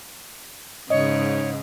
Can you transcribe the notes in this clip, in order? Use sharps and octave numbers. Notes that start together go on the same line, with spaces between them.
G#2 C#3 C#5 D#5